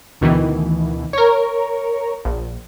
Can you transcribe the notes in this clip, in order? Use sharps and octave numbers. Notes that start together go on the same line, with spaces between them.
D2 B2 D#3 E3
A#4 C#5
A#1